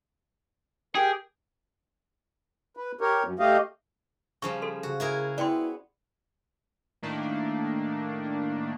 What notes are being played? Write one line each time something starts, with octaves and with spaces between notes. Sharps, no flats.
G4 G#4 A#4 G5
B4
G4 A#4 C#5
F#2
A3 G4 D#5 F5
C#3 F3 G3 C#6
A4 C6
C#3 F#4
E4 G#4 A#4
B3 E4 D5 G5 C6
A2 D#3 A3 A#3 D4